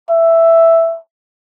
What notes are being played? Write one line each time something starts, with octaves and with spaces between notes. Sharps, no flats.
E5